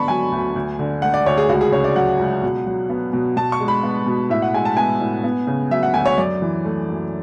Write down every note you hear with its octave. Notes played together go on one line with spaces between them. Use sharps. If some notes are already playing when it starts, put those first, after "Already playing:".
Already playing: D3 B3 A5 B5 C#6
F#3 G#5
D2
D2
D3
A3 F#5
D5
D2 C#5
G#4
C#2 F#4
G#4
C#3 C#5
D5
F#3 F#5
C#2
B2
F#3
B3
B2
B2 A5
C#6
G#3
B5
B3
B2
A2 E5
F#5
G#3 G#5
A5
B3 G#5
A2
B3
C#3
F#3 E5
F#5
D2 G#5
C#5
F#2 D5
E3
A3
F#2